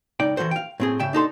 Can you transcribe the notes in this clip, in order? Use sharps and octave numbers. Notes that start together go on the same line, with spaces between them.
C#2 D#4 D5 G5
E3 G3 F#4 A4 C5
F5 G5
A2 C4 G#4
G#2 C#3 E5 G5
D4 D#4 A4 C6